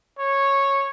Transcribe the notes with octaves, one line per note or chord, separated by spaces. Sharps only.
C#5